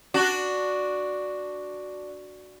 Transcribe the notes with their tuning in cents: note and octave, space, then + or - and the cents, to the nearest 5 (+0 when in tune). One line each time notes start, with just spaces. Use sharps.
D4 +0 F#4 +0